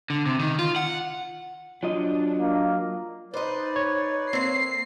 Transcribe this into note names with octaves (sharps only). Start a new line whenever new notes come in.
D3
C3
D#3
F4
F#5
F#3 D4 F4 D#5
A#3
D#4 B4 C5 D5 D#5
C#5
A#3 C4 C7